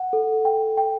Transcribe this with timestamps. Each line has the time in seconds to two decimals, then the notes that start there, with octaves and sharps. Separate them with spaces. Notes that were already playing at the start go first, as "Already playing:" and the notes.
Already playing: F#5
0.13 A4
0.45 G5
0.77 G5